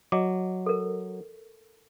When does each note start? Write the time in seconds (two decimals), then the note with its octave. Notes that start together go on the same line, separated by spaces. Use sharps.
0.12 F#3 D#5 D6
0.66 A4 A#4